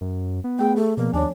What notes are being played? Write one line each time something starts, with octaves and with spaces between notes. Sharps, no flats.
F#2
B3
A3 G#4 G5
A3 G#4
B2 F3 A#3 B3
D#2 D4 C#5 G#5